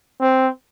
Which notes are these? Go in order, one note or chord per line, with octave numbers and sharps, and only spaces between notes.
C4